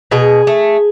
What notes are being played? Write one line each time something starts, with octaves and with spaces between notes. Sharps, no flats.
B2 G#4
A3